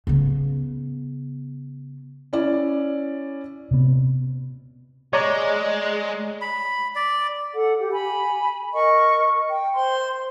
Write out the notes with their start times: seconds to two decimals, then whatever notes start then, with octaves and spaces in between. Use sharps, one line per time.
0.07 C#3 B3
2.33 C#4 E4 D5
3.71 C3 B3
5.13 G#3 C#5 D5 A#5
6.41 B5
6.95 D5
7.53 A4 F#5
7.81 G4
7.92 G#5 B5
8.74 A#4 D#5 C#6
9.49 G5
9.75 C5 C6